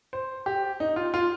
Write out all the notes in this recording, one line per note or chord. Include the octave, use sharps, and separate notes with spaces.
C5
G4
D#4
F4
F4